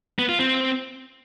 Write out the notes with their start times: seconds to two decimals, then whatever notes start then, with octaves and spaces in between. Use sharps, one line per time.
0.19 B3
0.29 F4
0.39 C4